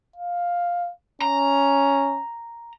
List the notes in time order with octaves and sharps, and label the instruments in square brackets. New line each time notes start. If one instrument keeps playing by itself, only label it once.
[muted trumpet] F5
[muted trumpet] C#4 [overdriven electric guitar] A#5